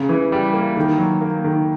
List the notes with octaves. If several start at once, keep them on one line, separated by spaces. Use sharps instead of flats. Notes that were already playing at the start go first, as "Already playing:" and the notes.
Already playing: C#3
E3
G3
A#3
D#3
F#3
A#3
D#3